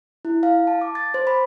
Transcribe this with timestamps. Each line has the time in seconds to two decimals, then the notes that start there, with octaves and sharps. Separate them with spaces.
0.25 E4
0.43 F5
0.67 A5
0.81 D6
0.95 A6
1.14 C5
1.27 B5